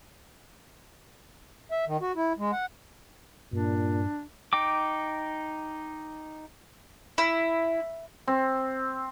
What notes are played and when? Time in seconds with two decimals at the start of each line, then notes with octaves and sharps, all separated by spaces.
1.71 E5
1.88 D#3
2.02 F#4
2.16 E4
2.39 G#3
2.52 F#5
3.53 G2 A#2 D4
4.53 D#4 G5 D6
7.18 E4
8.27 C4